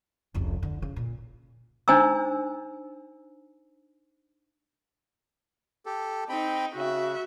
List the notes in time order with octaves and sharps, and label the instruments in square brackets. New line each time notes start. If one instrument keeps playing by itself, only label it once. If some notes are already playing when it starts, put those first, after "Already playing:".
[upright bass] F1 C#2
D3
C#3
A#2
[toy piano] D4 D#4 C5 G#5 A#5 E6
[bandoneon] G4 A4
[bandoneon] C4 G5 B5 [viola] D#4
[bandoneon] C#3 [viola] F#4 E5